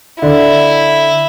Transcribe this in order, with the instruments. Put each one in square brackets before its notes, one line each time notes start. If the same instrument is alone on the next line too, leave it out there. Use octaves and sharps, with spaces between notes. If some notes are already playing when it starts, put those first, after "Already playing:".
[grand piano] D3 D4 [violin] E4